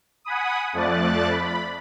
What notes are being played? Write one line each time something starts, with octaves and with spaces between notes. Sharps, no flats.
F#5 G#5 B5 D#6
F2 F3 A3 D5 F#6 A6
B5